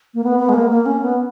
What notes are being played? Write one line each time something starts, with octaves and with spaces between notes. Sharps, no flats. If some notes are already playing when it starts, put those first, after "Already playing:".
A#3
B3
B3
G#3
A#3
A#3
C#4
B3